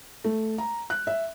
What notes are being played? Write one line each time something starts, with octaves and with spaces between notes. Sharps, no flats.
A3
A#5
F#6
E5